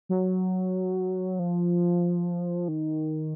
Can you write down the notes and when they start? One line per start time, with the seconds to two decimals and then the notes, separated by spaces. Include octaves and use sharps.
0.09 F#3
1.39 F3
2.68 D#3